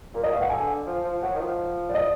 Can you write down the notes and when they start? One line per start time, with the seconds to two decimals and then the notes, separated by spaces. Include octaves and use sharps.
0.14 A#2 A#4
0.23 D#5
0.32 B2 F5
0.41 F#5
0.50 D3 G#5
0.86 F3
1.04 F3
1.22 F#3 F#5
1.35 D#3
1.41 F3
1.89 D5
1.94 D#5